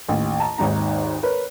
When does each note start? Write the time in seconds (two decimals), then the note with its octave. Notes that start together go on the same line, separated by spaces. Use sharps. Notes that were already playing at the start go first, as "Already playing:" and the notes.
0.09 A1 D#2
0.40 A5 A#5
0.58 G#1 D#2 G#2 D#4 A#5
1.23 A#4 B4 C#5